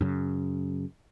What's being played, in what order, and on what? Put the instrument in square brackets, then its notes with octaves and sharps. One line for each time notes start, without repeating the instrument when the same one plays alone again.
[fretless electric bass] F#2 C#3